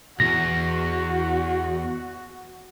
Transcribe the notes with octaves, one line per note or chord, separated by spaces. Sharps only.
B1 E2 F#4 A#6